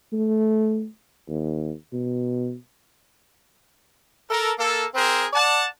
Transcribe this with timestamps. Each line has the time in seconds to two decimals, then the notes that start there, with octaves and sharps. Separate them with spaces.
0.13 A3
1.29 D#2
1.93 B2
4.30 A4 A#4
4.59 A#3 A4
4.95 C4 G#4 A#4 C5
5.33 D5 F#5 A5